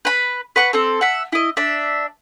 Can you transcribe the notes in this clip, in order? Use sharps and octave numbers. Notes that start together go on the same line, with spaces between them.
B4 B5
B4 F#5 C#6
C4 A4
E5 F#5
E4 D#5
D4 E5